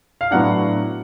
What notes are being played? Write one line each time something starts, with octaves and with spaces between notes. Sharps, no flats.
F5
A2 F#3 B3 D4 F#5